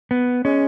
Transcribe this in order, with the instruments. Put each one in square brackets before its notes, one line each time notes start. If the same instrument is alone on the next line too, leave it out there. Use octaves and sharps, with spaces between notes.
[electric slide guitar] B3
[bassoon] G#3 [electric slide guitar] C#4